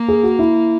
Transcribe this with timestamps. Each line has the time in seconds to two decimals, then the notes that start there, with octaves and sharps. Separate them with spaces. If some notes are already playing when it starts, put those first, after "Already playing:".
Already playing: A#3
0.08 G#4
0.24 F#4
0.39 E4